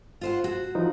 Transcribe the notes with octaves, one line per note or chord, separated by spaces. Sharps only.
F4 C5 F#5
F#4
E3 F3 D#4